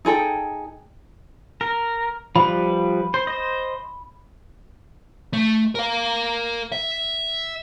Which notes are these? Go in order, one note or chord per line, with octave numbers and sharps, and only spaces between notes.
D#4 G#4 A4 G5
A#4
F3 G3 B4 B5
C5
C5 D#5
A3
A#4 F5
E5